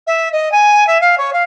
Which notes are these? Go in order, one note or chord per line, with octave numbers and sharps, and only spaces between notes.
E5
D#5
G#5
E5
F5
C#5
F5